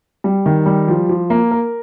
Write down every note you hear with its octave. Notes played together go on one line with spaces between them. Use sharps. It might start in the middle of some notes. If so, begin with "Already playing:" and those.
G3
D#3
G3
F3
F3
A#3
A#4